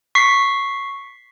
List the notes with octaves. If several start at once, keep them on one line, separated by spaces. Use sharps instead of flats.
C#6 B6 C7